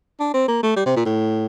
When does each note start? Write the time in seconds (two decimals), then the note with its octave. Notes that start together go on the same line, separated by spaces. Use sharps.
0.20 D4
0.34 C4
0.48 A#3
0.63 A3
0.77 G3
0.86 C3
0.96 A#2
1.05 A2